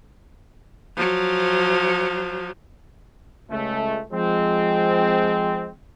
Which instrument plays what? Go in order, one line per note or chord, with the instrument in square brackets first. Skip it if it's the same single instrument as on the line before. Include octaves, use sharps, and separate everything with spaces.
[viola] F3 F#3
[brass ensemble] C#2 A3
F3 G#3 C4